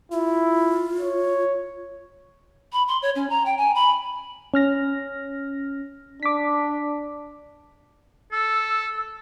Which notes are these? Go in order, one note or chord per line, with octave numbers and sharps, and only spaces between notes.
E4 F4
C#5
B5
C6
C#5
C#4
A#5
G5
G#5
B5
C#4 F6 A#6
D4 D6 B6
A4 E6